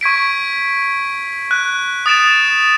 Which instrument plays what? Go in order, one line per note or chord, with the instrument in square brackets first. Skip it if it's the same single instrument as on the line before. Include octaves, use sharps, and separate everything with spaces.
[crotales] C#6 G#6 B6 D7
F#6
D#6 A6 D7 E7